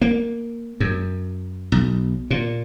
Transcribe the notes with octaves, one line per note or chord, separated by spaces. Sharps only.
A#3
F#2
B1
A#2